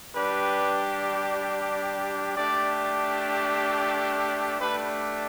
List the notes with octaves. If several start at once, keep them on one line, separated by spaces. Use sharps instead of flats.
G3 D4 G4 B4
A3 D4 G4 D5
A3 D4 G4 B4